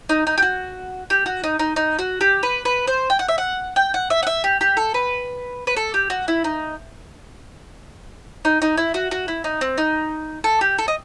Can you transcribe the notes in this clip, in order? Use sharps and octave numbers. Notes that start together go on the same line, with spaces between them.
D#4
D#4
G4
F#4
G4
F#4
D#4
D#4
D#4
F#4
G4
B4
B4
C5
G5
F#5
E5
F#5
G5
F#5
E5
F#5
E5
G4
G4
A4
B4
B4
A4
G4
F#4
E4
D#4
D#4
D#4
E4
F#4
F#4
E4
D#4
C4
D#4
A4
G4
A4
D#5